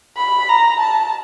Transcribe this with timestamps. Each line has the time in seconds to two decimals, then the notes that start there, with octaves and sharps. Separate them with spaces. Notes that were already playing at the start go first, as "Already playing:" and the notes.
0.17 B5
0.49 A#5
0.80 A5